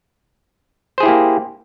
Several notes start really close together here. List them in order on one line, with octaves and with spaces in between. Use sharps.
C5 G#4 E4 G4 A#3